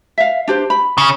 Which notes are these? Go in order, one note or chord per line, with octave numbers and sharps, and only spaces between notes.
E5 F5
D4 G4 C5
B5
C#3